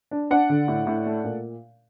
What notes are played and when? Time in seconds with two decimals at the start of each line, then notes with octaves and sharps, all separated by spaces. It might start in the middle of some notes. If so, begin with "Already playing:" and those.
0.11 D4
0.31 D4 D5 F#5
0.49 D3
0.68 A2
0.87 A2
1.06 A3
1.24 A#2